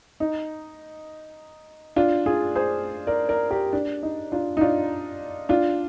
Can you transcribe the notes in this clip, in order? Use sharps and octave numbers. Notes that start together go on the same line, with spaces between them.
D#4
D4 F4
F4 G#4
G#4 C5
A#4 D5
A#4 D5
G4 A#4
D4
D#4
D4 F4
D#4
D4 F4
D4 F4